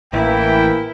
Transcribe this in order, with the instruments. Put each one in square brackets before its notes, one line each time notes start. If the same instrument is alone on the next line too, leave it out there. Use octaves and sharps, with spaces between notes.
[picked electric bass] A1 [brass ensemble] E3 A#3 [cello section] E4 [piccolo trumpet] G5